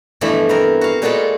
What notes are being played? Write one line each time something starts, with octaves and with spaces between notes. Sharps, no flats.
G2 B2 E3 F3 A3
B3 C4 A#4
F#4 F5
A#2 G#3 F4 F#4 A4 B5